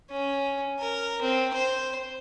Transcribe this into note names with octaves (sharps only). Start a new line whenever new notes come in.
C#4
A#4
C4
C5